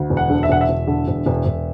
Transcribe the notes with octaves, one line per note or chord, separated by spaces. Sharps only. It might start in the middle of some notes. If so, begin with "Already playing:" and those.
Already playing: D2
E1
F#5
D3
E5
E1 F#5
E5
E1
D3
E1
E1
E1